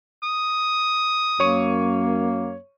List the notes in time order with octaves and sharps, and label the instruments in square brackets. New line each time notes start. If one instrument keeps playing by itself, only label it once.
[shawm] D#6
[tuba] F#2 [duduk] A#3 [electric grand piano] C#5 C#6 D#7